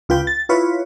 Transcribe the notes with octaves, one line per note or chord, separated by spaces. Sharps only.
C#2 F4 B4 G5
A6
E4 F4 B4 C#5